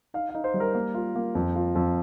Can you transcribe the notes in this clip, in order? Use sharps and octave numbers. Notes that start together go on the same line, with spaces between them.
D#4 F5
F5
D#4
C5
G3
A#4
A#3
F4
A#3
F2
F4
F2